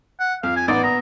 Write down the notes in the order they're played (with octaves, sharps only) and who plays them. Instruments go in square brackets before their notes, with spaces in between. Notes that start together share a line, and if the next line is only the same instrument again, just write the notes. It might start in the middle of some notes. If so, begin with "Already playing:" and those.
[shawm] F#5
[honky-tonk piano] F2 [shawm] F5
[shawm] G#5
[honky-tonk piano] A1 D#4 [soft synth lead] B3 [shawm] D5
[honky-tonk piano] A#1 D#6 [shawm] A#5